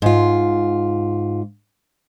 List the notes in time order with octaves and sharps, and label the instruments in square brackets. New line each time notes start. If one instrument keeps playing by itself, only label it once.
[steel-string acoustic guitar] G#2 F4